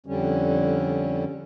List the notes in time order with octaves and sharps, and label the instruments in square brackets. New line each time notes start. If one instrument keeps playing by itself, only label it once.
[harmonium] F2 D3 G3 C#4